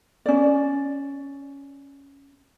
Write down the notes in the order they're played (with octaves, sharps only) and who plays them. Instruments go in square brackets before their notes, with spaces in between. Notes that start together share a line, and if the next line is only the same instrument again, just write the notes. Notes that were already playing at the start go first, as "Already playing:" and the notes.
[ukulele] C#4 D5